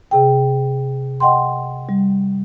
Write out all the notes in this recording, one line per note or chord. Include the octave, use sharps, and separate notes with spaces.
C3 G#4 G5
D#5 F#5 G5 C6
G3